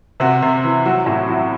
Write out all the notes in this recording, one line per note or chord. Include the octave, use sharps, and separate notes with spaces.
C3 F#4
C3
E3
F#3 F#4
A2 F#4
F#3 F#4